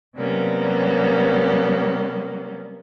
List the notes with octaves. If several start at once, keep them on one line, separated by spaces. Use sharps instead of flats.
C3 F#3 G3 A#3 B3 C#4